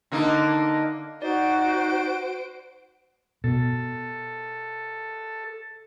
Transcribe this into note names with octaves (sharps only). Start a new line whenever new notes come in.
D3 A#3 D#4
D#4 F#4 C5 D5 D7
B2 A4